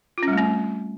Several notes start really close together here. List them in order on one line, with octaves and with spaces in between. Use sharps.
F4 C#4 G3 A3 C4